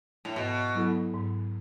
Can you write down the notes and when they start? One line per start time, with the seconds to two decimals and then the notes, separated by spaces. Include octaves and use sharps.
0.25 A2
0.35 G#2 B2
0.75 F#3 B3 E4 A4
1.14 G#2